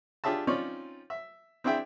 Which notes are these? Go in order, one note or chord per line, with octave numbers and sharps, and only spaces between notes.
D4 F4 G4 G#4 E5 A5
C4 C#4 D#4 F4 C#5 D5
E5
C4 D4 E4 G#4 E5 G5